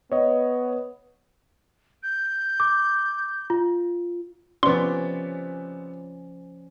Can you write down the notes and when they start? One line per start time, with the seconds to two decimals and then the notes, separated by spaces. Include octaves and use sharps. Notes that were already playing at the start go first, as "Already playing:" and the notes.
0.12 B3 C#5 D#5
2.03 G6
2.60 D6
3.50 F4
4.63 C3 F3 B3 C#4 D5 C6